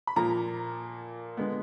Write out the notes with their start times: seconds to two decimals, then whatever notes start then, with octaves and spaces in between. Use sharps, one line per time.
0.07 B5
0.16 A#2 F3 A#3 A#5
1.37 D3 G#3 B3